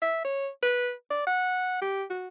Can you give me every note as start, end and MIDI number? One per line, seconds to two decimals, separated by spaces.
0.02 0.21 76
0.25 0.49 73
0.62 0.92 71
1.10 1.26 74
1.27 1.80 78
1.81 2.03 67
2.10 2.28 66